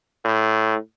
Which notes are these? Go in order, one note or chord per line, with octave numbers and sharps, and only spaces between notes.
A2